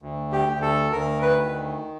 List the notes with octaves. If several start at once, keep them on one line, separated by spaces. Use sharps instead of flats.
D2
G4
D2
A4
D2 A#4
B4
D#3